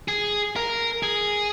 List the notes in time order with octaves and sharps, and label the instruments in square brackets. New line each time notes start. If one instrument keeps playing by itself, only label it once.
[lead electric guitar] G#4
A#4
G#4